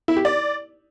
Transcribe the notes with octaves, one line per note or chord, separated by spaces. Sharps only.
E4
G4
D5